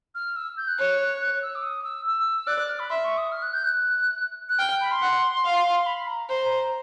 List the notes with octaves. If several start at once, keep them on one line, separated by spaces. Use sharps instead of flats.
F6
E6
G6
F#6
C#5
F#6
E6
D6
D#6
E6
E6
D5 F#6
F#6
F6
B5
E5 C6
C#6
D#6
F6
F#6
G6
F#6
F#6
G5 F6
B5
C6
F#5
F5
B5
A#5
C5 A#5
A#5